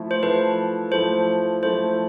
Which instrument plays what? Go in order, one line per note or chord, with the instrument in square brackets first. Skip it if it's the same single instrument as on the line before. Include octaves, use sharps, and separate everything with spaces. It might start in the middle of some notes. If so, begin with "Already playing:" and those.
Already playing: [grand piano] F3 A3 E4 A4
[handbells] C5
[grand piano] F3 A3 E4 A4 [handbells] B4
[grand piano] F3 A3 E4 A4 [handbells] C5
[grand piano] F3 A3 E4 A4 [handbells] C5